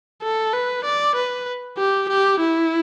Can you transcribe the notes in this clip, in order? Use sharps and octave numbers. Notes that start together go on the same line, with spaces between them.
A4
B4
D5
B4
G4
G4
E4